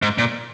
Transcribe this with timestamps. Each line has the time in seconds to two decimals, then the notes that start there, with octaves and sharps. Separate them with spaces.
0.02 G#2
0.18 A#2